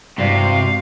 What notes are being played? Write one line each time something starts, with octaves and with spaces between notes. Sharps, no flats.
G2 C3 G#3 E4 F#4 D5 F5